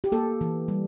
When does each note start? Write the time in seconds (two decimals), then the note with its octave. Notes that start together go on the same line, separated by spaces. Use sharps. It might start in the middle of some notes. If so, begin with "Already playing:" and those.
0.04 G4
0.12 A#3 A4
0.41 E3
0.68 G3